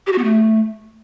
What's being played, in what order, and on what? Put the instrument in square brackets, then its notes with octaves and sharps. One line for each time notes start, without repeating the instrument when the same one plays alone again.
[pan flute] G4
F#4
B3
A3